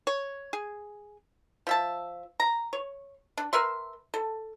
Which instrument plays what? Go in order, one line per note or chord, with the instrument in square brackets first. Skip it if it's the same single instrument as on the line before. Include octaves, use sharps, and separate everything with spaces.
[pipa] C#5
G#4
F3 E5 A5
A#5
C#5
D4
A#4 B4 E5 C6
A4